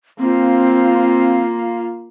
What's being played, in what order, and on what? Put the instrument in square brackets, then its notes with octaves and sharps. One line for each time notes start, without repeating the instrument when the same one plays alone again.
[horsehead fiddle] A#3 F4 [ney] C4